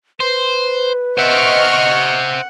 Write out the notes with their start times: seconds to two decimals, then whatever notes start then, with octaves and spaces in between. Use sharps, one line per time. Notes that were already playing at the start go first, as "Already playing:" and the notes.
0.20 B4 C5
1.18 C5 D#5 E5 F#5 C#6 F6